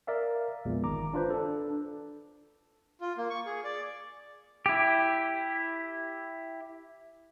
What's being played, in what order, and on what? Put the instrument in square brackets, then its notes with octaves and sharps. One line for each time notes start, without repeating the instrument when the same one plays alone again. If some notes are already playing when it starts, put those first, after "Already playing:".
[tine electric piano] A#4 D5 E5 F5
A#1 E2 A#2 G#3
G1 D#3 A#5 D6
D4 F4 B4 C5
D4 A4
[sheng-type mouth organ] F4
A#3
C#6
G#4
D5
[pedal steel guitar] E4 G4